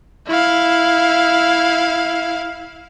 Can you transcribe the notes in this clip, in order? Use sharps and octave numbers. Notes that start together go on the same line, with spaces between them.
E4 F5